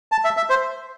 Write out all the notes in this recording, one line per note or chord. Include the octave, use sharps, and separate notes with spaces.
A5
E5
E5
C5